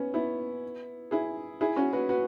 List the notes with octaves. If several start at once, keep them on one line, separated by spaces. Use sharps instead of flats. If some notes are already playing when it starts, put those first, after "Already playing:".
Already playing: B3 C#4
B3 E4
E4 G#4
E4 G#4
C#4 F#4
F#4 B4
F#4 B4